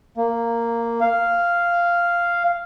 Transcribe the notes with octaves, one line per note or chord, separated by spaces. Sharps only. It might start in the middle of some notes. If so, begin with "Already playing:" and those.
A#3
F5